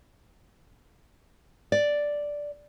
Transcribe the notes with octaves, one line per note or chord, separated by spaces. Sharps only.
D5